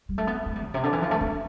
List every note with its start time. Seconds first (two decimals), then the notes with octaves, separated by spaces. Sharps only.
0.09 G3
0.18 A3
0.27 B3
0.46 A3
0.56 G3
0.65 A2
0.74 C3
0.83 D3
0.93 E3
1.02 F3
1.11 A3
1.21 D4